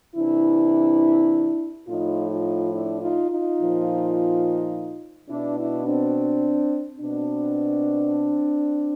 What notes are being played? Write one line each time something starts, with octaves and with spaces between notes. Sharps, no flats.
C3 E3 D4 E4
A2 F3 D#4 F4
D#4 F4
D4 E4
D#4 F4
D#4 F4
A#2 F3
B2 D4 E4
D4 E4
C4 D4
B2 C4 D4